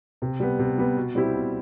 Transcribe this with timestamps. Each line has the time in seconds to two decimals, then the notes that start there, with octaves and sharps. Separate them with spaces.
0.22 C3
0.40 G3 B3
0.59 C3
0.78 G3 B3
0.97 B2
1.15 G3 C4 E4 G4
1.34 B2